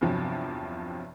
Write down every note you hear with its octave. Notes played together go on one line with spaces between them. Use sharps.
E2 G2 C3 F3 F#3